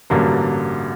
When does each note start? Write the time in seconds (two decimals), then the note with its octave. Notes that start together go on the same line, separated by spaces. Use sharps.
0.10 A1 G2 D3 F#3 A#3